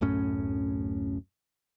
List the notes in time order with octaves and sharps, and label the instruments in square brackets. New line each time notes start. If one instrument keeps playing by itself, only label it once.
[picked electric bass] D1 F#2 A2 C#4